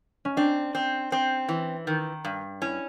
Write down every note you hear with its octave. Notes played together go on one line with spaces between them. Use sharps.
C#4
C4 D4
C4
C4
E3
D#3
G2
C#4 E4